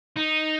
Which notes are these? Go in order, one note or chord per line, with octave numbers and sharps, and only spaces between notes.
D#4